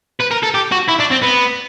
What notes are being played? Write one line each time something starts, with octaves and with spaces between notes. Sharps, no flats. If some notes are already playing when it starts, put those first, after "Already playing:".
B4
A#4
A4
G4
F#4
E4
D4
C4
B3